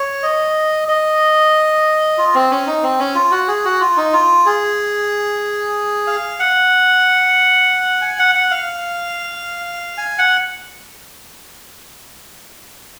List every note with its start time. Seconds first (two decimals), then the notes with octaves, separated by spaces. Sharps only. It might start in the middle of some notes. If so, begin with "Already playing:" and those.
Already playing: C#5
0.23 D#5
0.88 D#5
2.18 F4
2.35 C4
2.51 C#4
2.67 D#4
2.83 C4
2.99 C#4
3.15 F4
3.31 F#4
3.48 G#4
3.65 F#4
3.81 F4
3.97 D#4
4.13 F4
4.46 G#4
6.07 F5
6.40 F#5
8.02 G#5
8.19 F#5
8.35 F#5
8.51 F5
9.98 G#5
10.18 F#5